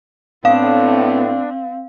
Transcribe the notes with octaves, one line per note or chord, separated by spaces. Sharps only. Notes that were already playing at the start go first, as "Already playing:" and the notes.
A2 B3 C4 D4 F5